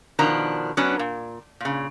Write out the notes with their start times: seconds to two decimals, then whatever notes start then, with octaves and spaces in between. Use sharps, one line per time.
0.19 B2 D#3 F3 D4 A#5
0.77 F#3 B3 C#4 D4
0.99 A#2
1.61 A#2 C#3